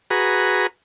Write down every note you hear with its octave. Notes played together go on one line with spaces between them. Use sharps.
F#4 G#4 B4 A#5